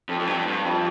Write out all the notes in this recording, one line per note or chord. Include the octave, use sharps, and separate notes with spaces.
F2
F2
G2
G2
F2